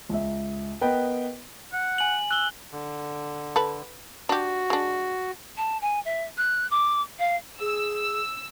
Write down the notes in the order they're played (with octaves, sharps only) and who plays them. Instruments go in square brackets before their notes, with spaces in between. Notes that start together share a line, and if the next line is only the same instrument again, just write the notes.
[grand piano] C#2 E5
B3 A#4 B4 D#5 G5
[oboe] F#5
[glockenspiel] G#5 F#7
[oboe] E6 [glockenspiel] F#6 G7
[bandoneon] D3
[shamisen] A4 B4
[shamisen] D4 G4 [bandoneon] F#4
[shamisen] G#3 D4
[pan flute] A5
G#5
E5
F#6
D6
F5
[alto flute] G#4 [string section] E6